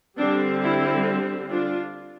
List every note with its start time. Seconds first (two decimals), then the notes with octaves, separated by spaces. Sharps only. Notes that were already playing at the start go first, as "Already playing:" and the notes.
0.17 D3 G3 C4 D4
0.62 E4
1.49 D4 F4